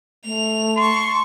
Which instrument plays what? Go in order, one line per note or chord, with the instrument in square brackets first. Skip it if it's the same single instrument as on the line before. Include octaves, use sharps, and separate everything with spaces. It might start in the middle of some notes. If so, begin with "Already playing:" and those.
[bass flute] A3 [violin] F7
[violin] A5 C#6 [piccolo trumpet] C6